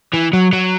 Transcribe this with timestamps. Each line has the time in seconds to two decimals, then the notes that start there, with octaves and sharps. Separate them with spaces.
0.13 E3
0.33 F#3
0.53 F#3